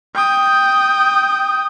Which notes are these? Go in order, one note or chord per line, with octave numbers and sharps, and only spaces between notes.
G5 D#6